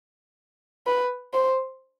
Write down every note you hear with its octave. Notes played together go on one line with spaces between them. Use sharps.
B4
C5